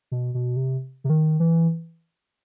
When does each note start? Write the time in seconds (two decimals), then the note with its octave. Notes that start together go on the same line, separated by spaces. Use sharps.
0.11 B2
0.34 B2
0.56 C3
1.04 C3
1.10 D#3
1.40 E3